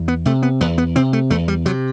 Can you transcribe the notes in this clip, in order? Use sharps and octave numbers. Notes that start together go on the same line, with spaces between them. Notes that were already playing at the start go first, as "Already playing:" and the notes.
Already playing: E2
B3
C3 A3
B3
E2 B3
B3
C3 C4
A3
E2 A3
G3
C3 F#3